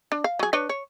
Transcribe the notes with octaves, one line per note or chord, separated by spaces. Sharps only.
D4
F5
F#3 G#4
D4 B4 C#5
C#5